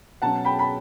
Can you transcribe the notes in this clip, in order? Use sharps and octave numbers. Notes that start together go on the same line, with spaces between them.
B2 F#3 C#4 F#5 A5
G5 B5
B5